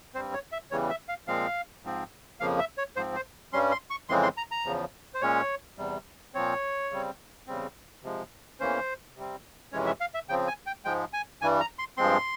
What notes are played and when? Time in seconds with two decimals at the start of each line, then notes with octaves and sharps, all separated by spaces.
0.14 G2 G3 C4 C5
0.34 C#5
0.52 E5
0.71 E2 C#3 E3 G3 C#5
0.90 E5
1.09 F5
1.27 A#2 F3 G#3 C4 F5
1.84 G#2 F3 C4
2.40 F2 C#3 F3 A#3 F5
2.59 E5
2.78 C#5
2.96 G#2 F3 C4 C5
3.15 C5
3.53 G2 G3 C#4 C6
3.72 C6
3.90 C#6
4.09 F2 C#3 E3 G#3 C4 C6
4.23 C6
4.37 A#5
4.51 A#5
4.65 E2 C#3 F3
5.14 C5
5.21 A#2 G#3 C#4 C#5
5.78 E2 C3 G3
6.34 A#2 F3 C4 C#5
6.91 C#3 G3 C4
7.47 E2 C#3 G3 C4
8.03 C3 F3 G#3
8.60 E2 E3 A#3 C#4 C5
9.16 C3 G3 C4
9.72 F2 C3 E3 G#3 C#4 C#5
9.86 E5
10.01 F5
10.14 E5
10.29 C#3 F3 C4 G5
10.48 G#5
10.66 G5
10.85 G#2 F3 G#3 G5
11.13 G#5
11.41 G2 E3 G3 G#5
11.60 A#5
11.79 C6
11.98 G2 F3 G#3 C4 C6